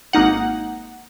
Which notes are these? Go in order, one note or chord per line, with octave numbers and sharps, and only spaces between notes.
G#1 A#3 D#4 F#5